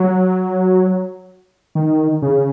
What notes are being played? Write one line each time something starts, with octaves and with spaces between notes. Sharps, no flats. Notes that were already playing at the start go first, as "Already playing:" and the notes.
Already playing: F#3
D#3
C#3